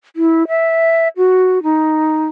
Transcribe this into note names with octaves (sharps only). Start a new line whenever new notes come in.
E4
E5
F#4
D#4